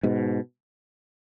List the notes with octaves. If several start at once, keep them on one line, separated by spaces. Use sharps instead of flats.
G#2 B2